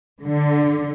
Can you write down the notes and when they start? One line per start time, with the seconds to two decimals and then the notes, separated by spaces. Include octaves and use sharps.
0.23 D3